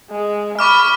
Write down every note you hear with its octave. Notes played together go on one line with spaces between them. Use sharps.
G#3
B5 C#6 D6 F6